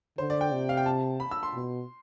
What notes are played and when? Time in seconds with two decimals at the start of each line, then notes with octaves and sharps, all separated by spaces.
0.18 D3 C5
0.30 D5
0.41 G5
0.52 C3
0.69 F5
0.77 G5
0.86 A5
1.20 B5
1.31 E6
1.43 C6
1.54 B2